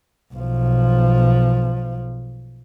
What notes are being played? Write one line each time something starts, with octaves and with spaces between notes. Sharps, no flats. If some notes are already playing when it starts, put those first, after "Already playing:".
B1 F3